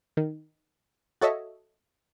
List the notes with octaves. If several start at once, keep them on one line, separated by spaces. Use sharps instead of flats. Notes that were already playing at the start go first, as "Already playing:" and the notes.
D#3
F#4 A4 C#5 D#5 E5